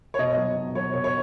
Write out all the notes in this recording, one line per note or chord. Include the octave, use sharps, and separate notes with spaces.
C#5
B2 D#5
F#3
B2
F#3 C#5
B2 C#5
C#5